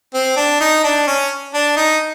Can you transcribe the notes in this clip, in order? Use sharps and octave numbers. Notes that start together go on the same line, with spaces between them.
C4
D4
D#4
D4
C#4
D4
D#4